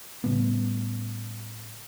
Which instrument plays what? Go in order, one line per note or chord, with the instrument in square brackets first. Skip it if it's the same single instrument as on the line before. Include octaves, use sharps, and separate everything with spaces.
[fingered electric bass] A2 C#3 G3 B3